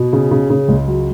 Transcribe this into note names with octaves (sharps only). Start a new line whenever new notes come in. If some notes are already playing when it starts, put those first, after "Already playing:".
Already playing: B2
C#3
C#3
C#3
C#2
F#3